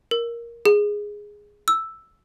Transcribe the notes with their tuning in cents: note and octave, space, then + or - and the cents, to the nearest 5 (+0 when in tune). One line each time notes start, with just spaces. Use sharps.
A#4 +5
G#4 -5
E6 +0